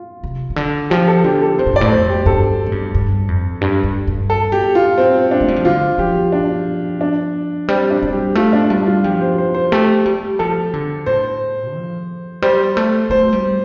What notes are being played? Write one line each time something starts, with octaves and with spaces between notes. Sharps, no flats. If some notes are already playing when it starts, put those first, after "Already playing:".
Already playing: F4
C3
C3
D3
F3 G4
A4
D3 G4
A4
C3 C5
A2
G2 D5
A2
F2 C5
G4
G2 A4
A2
G2
G2
F2
G2
G2
G2
A4
G4
F4
C4
D4
A3
G3
F3
D3 F4
F3 G4
D4
D4
G3 C4
D4
G3
G4
A3 F4
D4
G3 D4
F4
F3 G4
C5
C5
C5
A3 G4
G3
F3 A4
D3
A2 C5
F3
G3 C5
A3
A3 C5
G3